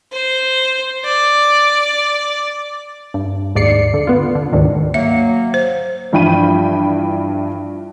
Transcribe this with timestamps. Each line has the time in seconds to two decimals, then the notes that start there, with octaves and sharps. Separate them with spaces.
0.12 C5
1.05 D5
3.14 G2
3.55 D#2 G#2 D5 C7 C#7
3.94 D3
4.07 B3 F4
4.35 D3
4.52 D2 G#2 D3 D#3
4.94 F#3 A#3 E5
5.54 C5
6.13 G2 E3 F3 G5 B5 D#7